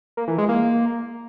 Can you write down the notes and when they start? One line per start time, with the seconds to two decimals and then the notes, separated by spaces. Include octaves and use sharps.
0.17 A#3
0.28 E3
0.38 G#3
0.49 A#3